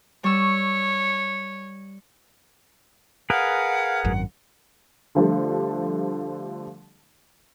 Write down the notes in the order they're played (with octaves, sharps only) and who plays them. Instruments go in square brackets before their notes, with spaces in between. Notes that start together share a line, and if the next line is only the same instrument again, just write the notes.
[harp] G3 C#6 E6 [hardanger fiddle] C#5
[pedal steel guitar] G#4 A#4 B4 [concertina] F5 [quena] F#5
[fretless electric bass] G#1 F#2
[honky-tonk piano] D3 F3 G3 A3